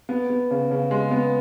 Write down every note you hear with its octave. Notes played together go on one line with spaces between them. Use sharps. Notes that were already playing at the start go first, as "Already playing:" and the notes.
B3
B3
C#3
C#3
G#3
B3